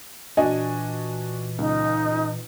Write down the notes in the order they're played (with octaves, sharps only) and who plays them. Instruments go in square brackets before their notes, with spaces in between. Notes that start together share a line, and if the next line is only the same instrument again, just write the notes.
[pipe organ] A#2 E3 [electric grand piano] D4 F#4 G#5 [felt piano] D#5
[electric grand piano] C#2 [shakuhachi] D#4